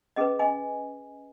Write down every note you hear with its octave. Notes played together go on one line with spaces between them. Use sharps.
C#4 G#4 B4 D#5
D#5 G#5